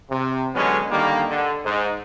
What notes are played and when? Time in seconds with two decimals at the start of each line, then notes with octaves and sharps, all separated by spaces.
0.11 C3
0.55 D3 F#3 G#3 B3 C#4
0.91 D3 D#3 G3 A#3
1.29 D3
1.65 G#2